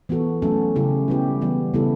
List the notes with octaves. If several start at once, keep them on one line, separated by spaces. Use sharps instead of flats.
E3 B3 F#4 A4
F#3 A3 C#4 F#4 A4
C#3 G3 C#4 E4 G4
G3 B3 E4 G4
E3 G3 B3
C#3 G3 B3 E4 A4